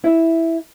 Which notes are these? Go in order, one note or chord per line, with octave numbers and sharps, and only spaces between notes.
E4